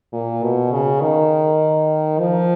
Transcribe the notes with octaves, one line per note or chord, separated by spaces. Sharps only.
A#2
B2
C#3
D#3
F3